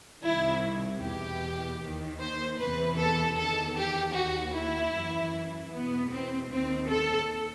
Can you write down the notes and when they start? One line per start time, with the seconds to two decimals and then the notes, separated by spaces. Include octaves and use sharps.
0.23 C2 C3 D#3 E4
1.01 E2 B2 G4
1.80 D#2 D#3
2.19 C5
2.58 E2 C3 E3 B4
2.97 A4
3.36 E2 D#3 A4
3.75 G4
4.14 D#2 D#3 F#4
4.54 E4
4.92 F#2 E3
5.71 E2 B2 B3
6.10 C4
6.49 D#2 D#3 C4
6.88 A4